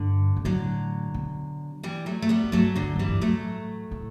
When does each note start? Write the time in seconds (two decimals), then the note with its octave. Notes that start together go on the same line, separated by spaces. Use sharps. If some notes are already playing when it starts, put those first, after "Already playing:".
Already playing: G2 D3
0.36 B2
0.45 A2 D3 F#3
1.14 B2
1.83 E3 G3
2.06 F#3 A3
2.22 A3
2.29 G3 B3
2.44 F#2
2.52 G2 F#3 A3
2.75 D3 F#3
2.82 E2
2.96 F#2 E3 G3
3.08 G2
3.21 A2 F#3 A3
3.91 A2